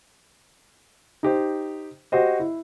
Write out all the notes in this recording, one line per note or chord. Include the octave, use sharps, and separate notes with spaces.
D#4 G4 C5
F#4 G4 C5 D#5
E4